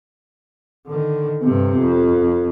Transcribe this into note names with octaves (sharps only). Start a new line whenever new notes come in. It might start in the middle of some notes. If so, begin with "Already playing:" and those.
D3 D#3
G2 C3
F2